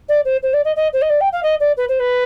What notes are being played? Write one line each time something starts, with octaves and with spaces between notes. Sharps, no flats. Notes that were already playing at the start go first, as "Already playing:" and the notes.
D5
C5
C5
D5
D#5
D#5
C5
D#5
D5
G5
F5
D#5
D5
B4
C5
B4